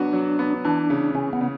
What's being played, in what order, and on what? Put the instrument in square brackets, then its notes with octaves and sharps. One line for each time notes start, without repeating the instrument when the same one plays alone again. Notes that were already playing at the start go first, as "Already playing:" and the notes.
Already playing: [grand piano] F#3 B3 F#4 [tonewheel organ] D4
[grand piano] F#3
B3
[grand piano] E3 [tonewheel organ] D4
[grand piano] C#3
[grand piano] C#3 [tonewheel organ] C#4
[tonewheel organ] B3
[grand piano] C#3